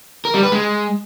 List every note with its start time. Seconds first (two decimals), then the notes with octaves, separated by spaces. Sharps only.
0.25 A#4
0.34 G3
0.43 B4
0.52 G#3